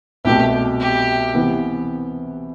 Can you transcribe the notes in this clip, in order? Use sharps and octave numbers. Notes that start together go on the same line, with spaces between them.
C2 B2 A3 G4
G4
C3 E3 B3